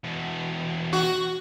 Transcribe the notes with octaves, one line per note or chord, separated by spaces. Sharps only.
E2 B2
F#4